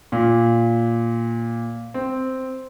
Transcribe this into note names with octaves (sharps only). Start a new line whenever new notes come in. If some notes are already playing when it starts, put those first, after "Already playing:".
A#2
C4